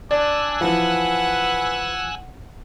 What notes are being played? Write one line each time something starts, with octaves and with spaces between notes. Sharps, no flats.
D4 D5 G#5 E6 F#6
E3 F3 B4 F#5